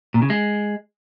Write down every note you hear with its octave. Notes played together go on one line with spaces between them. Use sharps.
A#2
C#3
G#3